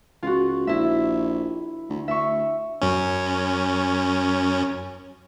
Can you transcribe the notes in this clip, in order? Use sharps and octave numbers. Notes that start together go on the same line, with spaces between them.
C#2 F4 F#4
A#1 E4 E5
D2
D2 E5 C#6
F#2 C#4